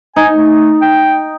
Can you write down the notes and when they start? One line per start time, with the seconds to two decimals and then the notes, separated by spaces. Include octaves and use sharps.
0.16 D#4 G#5
0.33 A3
0.81 G5